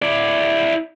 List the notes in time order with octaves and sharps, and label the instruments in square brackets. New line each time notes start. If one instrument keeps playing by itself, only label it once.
[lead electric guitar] E4 D5